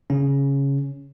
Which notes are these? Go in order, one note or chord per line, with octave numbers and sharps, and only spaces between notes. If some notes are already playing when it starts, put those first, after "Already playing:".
C#3 C#4